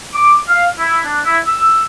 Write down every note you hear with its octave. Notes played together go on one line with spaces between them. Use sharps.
D6
F5
E4
D4
E4
E6